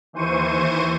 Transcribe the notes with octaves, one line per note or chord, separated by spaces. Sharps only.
D#2 E3 C5 C#6 D#7